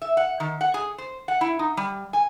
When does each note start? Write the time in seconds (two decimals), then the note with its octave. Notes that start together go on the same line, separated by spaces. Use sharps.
0.02 E5
0.17 F#5
0.40 D#3
0.61 F#5
0.74 G#4
0.98 C5
1.28 F#5
1.41 E4
1.59 D#4
1.77 G3
2.13 G#5